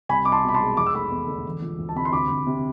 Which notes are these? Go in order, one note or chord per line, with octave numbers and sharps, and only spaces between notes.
C2 G#5 B5
C2 D6
A5 C6
B2
B5
A5 C6
G#3
F1 D6
E6
A3 B5 D6
E2
D3
E1
F3
D2
A5
C3 B5
C6
D2 B5 D6
D2
C3